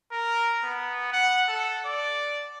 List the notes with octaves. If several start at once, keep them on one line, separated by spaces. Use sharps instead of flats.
A#4
B3
F#5
A4
D5